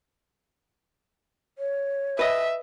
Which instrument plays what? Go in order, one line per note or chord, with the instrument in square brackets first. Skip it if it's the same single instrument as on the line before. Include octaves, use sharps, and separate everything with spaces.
[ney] C#5
[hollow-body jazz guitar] B4 D#5 [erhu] E5